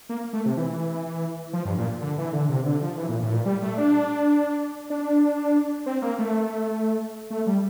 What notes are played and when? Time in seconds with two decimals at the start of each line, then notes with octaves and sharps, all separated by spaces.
0.09 A#3
0.33 A3
0.46 C3
0.57 E3
1.53 F3
1.65 G2
1.78 A#2
2.02 D3
2.18 E3
2.33 D3
2.49 C3
2.66 D3
2.81 F3
2.97 E3
3.09 A#2
3.22 A2
3.33 A#2
3.46 G3
3.62 A3
3.78 D4
4.90 D4
5.86 C4
6.02 A#3
6.19 A3
7.30 A3
7.47 G3